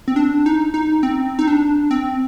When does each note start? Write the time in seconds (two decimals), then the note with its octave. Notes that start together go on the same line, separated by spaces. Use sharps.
0.08 C4
0.16 D4
0.46 D#4
0.74 D#4
1.03 C4
1.39 D#4
1.47 D4
1.91 C4